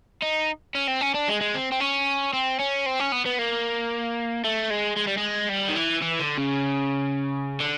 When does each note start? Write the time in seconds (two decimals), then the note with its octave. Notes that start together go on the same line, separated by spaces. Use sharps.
0.22 D#4
0.75 C#4
0.88 C4
1.01 C#4
1.14 D4
1.28 G#3
1.41 G#3
1.54 C4
1.72 C4
1.80 C#4
2.33 C4
2.59 C#4
2.86 C4
3.00 C#4
3.12 B3
3.25 B3
3.39 A#3
4.45 A3
4.71 G#3
4.97 G#3
5.07 G3
5.18 G#3
5.49 G3
5.70 D#3
5.76 E3
6.02 E3
6.20 D3
6.38 C#3
7.60 D3